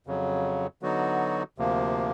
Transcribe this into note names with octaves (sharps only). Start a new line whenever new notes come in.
F2 C#3 F#3
D3 F#3 B3 D#4 F#4
D2 C3 F3 A#3